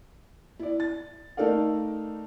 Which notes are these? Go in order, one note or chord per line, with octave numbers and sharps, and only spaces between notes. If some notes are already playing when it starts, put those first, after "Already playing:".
E4 D5
A6
A3 D#4 A4 A#4 D5 F5